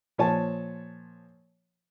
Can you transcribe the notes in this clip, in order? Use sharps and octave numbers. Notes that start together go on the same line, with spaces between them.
A#2 F3 C#5 G#5 A5